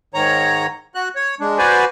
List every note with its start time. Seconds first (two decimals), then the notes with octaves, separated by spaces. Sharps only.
0.14 G#2 D#3 C#5 A#5
0.95 F#4 F#6
1.16 C#5
1.40 G#3 D4
1.58 F#4 B4 C5 D5 G#5